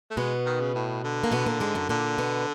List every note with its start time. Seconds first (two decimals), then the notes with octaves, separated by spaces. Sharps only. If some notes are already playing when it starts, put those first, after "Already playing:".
0.11 A3
0.17 B2 G#3 B3
0.46 D#3
0.60 C#3
0.75 A2
1.04 D3
1.24 A#3
1.32 B2 B3
1.46 A#2 A#3
1.60 G#2 G#3
1.75 F#2 F#3
1.89 A#2 D3 A#3
2.18 B2 B3